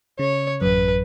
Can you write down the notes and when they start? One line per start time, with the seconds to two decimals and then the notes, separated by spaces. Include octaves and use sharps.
0.19 C#3 C#5
0.61 A1 F#2 B4